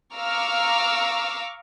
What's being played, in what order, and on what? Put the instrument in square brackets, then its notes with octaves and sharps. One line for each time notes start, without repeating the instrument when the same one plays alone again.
[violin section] F5 A#5 C#6 D6 E6 F6